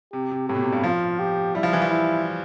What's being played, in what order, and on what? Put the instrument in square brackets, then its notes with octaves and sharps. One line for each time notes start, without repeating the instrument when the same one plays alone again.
[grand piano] C3 [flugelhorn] G4
[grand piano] C3
[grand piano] A2 [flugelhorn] G4
[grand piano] B2
C3
G2
[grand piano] F3 [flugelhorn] F4
[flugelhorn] G4
[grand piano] G3 [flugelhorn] E4
[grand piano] F3
E3
F3
[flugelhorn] E4